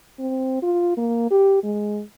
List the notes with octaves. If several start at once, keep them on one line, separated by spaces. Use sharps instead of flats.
C4
F4
A#3
G4
G#3